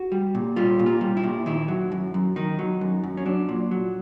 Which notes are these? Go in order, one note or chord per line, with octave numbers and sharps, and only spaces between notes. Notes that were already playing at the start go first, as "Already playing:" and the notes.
Already playing: F#4
G3
A#2
G3 F4
A#2
F4
G3
E4
A#2
D#3 E4
F#3
F#2
F#2
D#3 D#4
F#3
F#2
F#2
C#4
F#3 D4
A#2
F#3